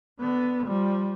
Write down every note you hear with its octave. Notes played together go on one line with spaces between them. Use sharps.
D3 B3
F3 G3